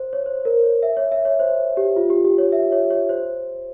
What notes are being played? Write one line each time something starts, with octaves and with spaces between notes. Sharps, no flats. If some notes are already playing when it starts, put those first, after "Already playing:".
Already playing: C5
C#5
C5
A#4
C#5
E5
C#5
E5
C#5
C5
G4
F4
G4
G4
C#5
E5
C#5
C#5
C5